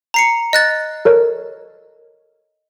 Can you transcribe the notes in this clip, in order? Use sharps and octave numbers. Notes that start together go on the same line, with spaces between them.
A#5 C7 C#7
D#5 F#6 A6
A4 A#4 C#5